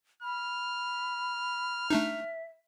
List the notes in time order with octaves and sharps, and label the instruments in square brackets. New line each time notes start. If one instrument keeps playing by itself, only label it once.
[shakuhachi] B5 [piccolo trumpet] F6
[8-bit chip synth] A3 D4 D#4 [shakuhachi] E5